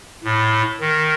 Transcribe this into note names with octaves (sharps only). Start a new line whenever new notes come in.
A2
D#3